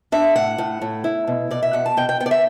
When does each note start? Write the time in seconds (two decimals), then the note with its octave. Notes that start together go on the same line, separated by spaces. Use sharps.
0.12 D4 E5
0.36 A2 F#5
0.58 A2
0.82 A2
1.04 E4
1.27 B2
1.50 B2 D5
1.62 E5
1.73 B2 F#5
1.86 A5
1.97 B2 G5
2.09 G5
2.20 B3 G5
2.26 D5
2.31 E5